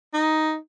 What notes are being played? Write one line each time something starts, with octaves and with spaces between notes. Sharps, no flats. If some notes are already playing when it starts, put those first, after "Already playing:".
D#4